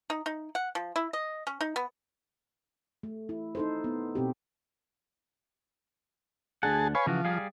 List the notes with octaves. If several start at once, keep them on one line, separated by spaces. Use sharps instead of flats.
D#4
D#4
F#5
F3
E4
D#5
C#4
D#4
B3
A3
E4
D#4 A4 C5
B3
B2 C4 G4
D2 D4 G#4 F#5 A5
B4 C#5 F5 G#5
C#3 E3 F3 F#4
G3 G#4 F5